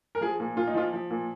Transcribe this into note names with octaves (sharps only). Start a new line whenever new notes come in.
A#4
F3 G#4
A#2
A#2 F4
D#4
F3 F4
F3
A#2